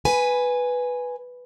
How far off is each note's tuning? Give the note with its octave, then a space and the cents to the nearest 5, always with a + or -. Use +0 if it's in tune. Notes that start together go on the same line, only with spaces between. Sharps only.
B4 +0 G#5 +0